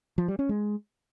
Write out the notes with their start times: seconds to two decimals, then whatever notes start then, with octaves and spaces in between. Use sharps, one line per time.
0.18 F3
0.28 G3
0.39 C#4
0.49 G#3